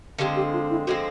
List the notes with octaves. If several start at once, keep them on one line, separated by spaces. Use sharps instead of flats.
D3 F3 G#3 C4 G4
G4
F4
E4
D3 F3 G#3 C4 F#4